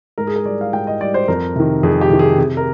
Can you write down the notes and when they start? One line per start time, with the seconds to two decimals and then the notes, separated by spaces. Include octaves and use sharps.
0.18 G#2 A#4
0.27 G#4
0.36 A#4
0.45 G3 D5
0.61 F5
0.73 G#2 G5
0.87 D#5
1.00 G3 D5
1.14 C5
1.28 F2 A#4
1.56 C3 D#3
1.83 F2 G#4
2.01 G4
2.10 C3 D#3
2.19 G#4
2.38 C3 G#4
2.57 A#4